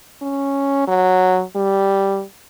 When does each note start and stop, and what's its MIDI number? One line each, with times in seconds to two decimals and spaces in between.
0.22 0.86 61
0.88 1.43 54
1.56 2.23 55